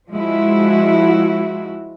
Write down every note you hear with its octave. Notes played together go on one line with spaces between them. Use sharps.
F3 G#3 E4 F#4